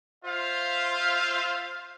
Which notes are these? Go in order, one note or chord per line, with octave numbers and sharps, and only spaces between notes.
F4 C5 E5 F5